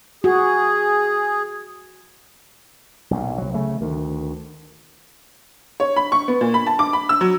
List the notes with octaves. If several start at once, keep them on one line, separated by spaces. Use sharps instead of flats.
F#4 G#4
B1 A#2
C2 F#3
C#3 A3
D2 D#3
C#5
B5
C#6
B3
A#2
B5
A5
D6
B5
E6
F#3